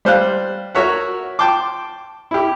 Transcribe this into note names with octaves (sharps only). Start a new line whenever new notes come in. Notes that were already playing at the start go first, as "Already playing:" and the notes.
G3 C5 F5 F#6
F#4 A#4 C#5 E5 F#5
G5 A5 C6 D6
E4 G4